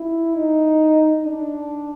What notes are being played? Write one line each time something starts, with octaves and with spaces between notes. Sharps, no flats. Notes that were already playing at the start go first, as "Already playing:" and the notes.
Already playing: E4
D#4
D4